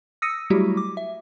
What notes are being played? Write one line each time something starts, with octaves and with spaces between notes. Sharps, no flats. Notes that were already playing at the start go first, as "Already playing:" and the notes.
D#6 E6 A#6 C#7 D#7
F#3 G3 A3 E4 F#4 G4
D6
E5